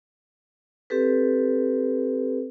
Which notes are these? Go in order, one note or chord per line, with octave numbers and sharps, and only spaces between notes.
C4 G4 A4 B4